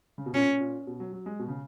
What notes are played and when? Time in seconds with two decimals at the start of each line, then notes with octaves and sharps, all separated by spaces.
0.18 C#3
0.26 B2
0.34 A#2 C#4
0.48 A#2
0.61 A#2
0.87 B2
1.00 F#3
1.13 F#3
1.26 G#3
1.39 B2
1.48 C#3